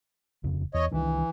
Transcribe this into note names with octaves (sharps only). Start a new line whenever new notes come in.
D#1 F2 C#3
E2 C#5 D#5
C2 D#3 E3 D4